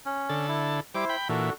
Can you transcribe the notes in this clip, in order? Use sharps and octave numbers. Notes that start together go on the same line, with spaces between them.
C#4
D3 A4
E4
G3 E4 C5 D6
G5 B5
A#2 E3 D4 F#4 A4